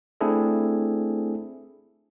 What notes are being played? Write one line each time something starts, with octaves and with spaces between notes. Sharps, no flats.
A3 C4 D4 E4 G#4 A4